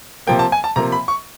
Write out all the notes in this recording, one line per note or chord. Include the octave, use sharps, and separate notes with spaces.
C3 F3 A#3 G5
A5
G#5
A5
C3 F3 A#3 A#5
B5
C#6